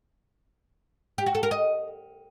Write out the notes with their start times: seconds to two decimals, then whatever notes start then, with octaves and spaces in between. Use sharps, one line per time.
1.18 G4
1.26 F#4
1.35 A4
1.43 A#4
1.51 D#5